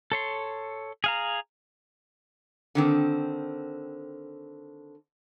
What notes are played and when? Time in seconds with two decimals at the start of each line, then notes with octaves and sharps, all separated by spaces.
0.12 A4 C#5 C6
1.04 G#4 F5 A#5
2.75 D3 D#3 C4